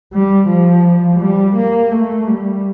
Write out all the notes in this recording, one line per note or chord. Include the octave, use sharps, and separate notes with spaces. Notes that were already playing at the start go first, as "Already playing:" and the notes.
G3
F3
G3
A#3
A3
G3